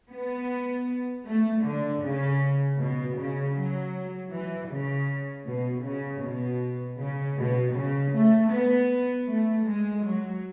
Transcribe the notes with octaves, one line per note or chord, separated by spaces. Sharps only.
B3
A3
D3
C#3
B2
C#3
F#3
E3
C#3
B2
C#3
B2
C#3
B2
C#3
A3
B3
A3
G#3
F#3